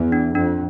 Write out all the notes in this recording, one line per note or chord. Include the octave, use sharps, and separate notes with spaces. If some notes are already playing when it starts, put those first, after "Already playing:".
Already playing: E2
D4
F2 D4